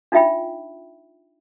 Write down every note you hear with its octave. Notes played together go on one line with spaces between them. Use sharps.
D4 D#4 F4 E5 G5 B5